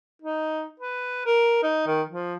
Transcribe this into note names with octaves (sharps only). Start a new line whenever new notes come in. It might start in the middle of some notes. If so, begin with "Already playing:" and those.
D#4
B4
A#4
D#4
D#3
F3